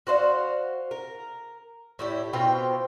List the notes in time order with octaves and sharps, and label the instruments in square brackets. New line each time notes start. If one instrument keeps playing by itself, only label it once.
[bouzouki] F#4 C5 D5 F5
A#4
A2 E4 G4
B2 C4 F4 G5